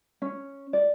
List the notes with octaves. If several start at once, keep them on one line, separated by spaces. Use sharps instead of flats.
C#4
D5